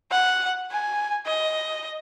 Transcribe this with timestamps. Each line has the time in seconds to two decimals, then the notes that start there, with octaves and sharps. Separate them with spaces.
0.11 F#5
0.71 G#5
1.26 D#5